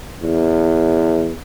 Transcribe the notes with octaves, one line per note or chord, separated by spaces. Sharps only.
E2